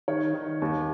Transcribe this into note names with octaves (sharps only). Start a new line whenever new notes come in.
D#3 C#5
D#3
D#2